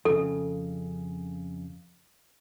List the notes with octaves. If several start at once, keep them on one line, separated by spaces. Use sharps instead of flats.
F2 C#3 A4